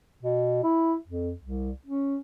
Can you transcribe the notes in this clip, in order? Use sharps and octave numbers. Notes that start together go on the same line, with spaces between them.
B2
E4
F2
C2
C#4